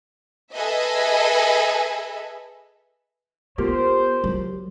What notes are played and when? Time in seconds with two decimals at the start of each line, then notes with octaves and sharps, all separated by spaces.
0.53 G#4 A4 B4 D#5 E5
3.58 B3 F4 G4 A#4 C5
4.24 F#3